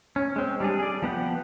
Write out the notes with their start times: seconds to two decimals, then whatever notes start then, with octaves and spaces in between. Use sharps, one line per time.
0.16 C#4
0.36 G#3 C4
0.60 G3 D4 G#4
0.80 G#4 D5
1.02 F3 B3 F#5 G5